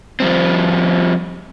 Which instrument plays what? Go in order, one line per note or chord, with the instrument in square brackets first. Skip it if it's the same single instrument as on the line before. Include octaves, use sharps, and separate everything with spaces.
[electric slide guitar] F3 G3 C4